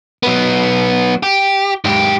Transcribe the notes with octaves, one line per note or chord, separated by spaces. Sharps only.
F#3 B3
G4
G#2 G4